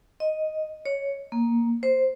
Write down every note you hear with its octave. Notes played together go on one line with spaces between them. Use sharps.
D#5
C#5
A#3
C5